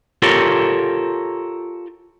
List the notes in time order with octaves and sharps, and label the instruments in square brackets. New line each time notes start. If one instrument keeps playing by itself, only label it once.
[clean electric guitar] F4 G4 A4 A#4 C#5